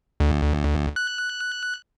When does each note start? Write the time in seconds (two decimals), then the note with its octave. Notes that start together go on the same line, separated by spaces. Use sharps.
0.20 D2
0.96 F#6